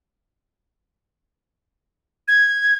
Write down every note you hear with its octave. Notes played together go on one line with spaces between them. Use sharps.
G#6